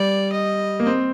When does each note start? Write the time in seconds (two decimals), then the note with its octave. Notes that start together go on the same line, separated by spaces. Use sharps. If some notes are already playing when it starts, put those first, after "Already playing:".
Already playing: G3 D5
0.32 D#5
0.80 A#3
0.87 C4